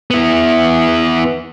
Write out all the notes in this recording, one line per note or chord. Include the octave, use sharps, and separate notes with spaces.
B3 E4